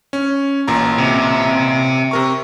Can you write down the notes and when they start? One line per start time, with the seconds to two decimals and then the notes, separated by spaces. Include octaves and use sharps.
0.13 C#4
0.68 A1 A#2 A#5
0.98 C3
2.11 C3 A#4 C#6